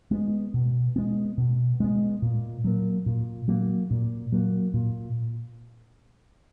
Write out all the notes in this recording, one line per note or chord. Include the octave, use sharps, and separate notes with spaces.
G#3 B3
B2
G#3 B3
B2
G#3 B3
A#2
F#3 A#3
A#2
F#3 A#3
A#2
F#3 A#3
A#2